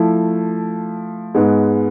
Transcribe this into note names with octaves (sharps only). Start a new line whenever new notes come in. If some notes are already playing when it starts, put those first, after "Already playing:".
Already playing: F3 A3 E4
G#2 G#3 B3